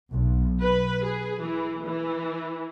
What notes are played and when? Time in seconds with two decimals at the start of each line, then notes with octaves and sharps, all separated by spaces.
0.11 B1
0.61 B4
1.05 G#4
1.42 E3
1.86 E3